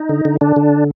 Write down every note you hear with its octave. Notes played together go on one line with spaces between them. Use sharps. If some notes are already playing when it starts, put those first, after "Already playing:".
Already playing: D#4
D3
D3
D3 D4
D3